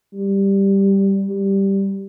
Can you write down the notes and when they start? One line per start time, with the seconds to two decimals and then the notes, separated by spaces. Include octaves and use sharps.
0.13 G3
1.29 G3